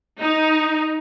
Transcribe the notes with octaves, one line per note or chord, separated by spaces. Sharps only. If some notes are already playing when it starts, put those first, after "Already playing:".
D#4